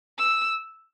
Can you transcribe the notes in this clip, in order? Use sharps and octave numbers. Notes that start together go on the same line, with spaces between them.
E6